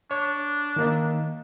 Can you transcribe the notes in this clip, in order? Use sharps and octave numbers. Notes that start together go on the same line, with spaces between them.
D4 C#5
D#3 A#3 D#4